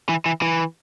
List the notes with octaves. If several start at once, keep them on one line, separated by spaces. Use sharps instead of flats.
E3
E3
E3